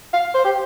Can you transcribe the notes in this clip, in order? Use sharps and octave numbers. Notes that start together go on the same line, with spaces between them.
F5
C5
G4